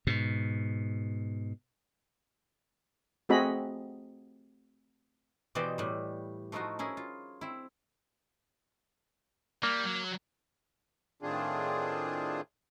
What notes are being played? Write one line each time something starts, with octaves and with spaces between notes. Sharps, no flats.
G#2 B2
A3 C4 F#4 G#4 D#5 B5
B2 E3 G4 C5 D5 D#5
A2 G3
F3 A3 D#4 F4 F#4 C6
C#4 E4 G#4 A#4
F4
C4 E4
G3 A#3
F#3
A2 D#3 C4 D4 F4 G#4